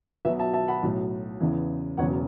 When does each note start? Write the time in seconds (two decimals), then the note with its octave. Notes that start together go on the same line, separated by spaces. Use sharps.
0.25 B1 B2 F#3 B4 E5
0.39 E5 A5
0.53 E5 A5
0.68 F#5 B5
0.83 B1 A2 F#3
1.40 E2 C#3 E3
1.97 E1 E2 C#3 F#3 C#5 F#5